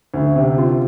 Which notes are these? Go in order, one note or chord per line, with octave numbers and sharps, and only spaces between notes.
D2
C3
F4